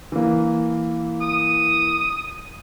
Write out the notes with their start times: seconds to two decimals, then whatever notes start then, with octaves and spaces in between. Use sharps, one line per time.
0.12 E3 A#3
1.21 D#6